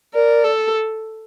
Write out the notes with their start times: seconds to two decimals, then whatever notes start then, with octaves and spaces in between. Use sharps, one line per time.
0.13 A#4 D5
0.44 A4